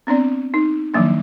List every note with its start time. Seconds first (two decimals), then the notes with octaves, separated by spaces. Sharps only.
0.07 B3 C4 D4 D5
0.54 D#4
0.94 D#3 F3 F#3 A#3 D4